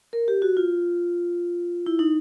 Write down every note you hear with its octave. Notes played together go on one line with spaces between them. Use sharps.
A#4
G4
F#4
F4
E4
D#4